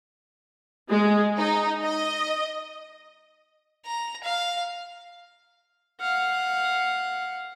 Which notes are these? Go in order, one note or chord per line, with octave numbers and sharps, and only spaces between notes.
G#3
D#4
D#5
A#5
F5
F5 F#5